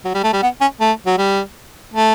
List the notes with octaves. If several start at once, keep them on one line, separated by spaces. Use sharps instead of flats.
F#3
G3
A3
G3
B3
C#4
A3
F#3
G3
A3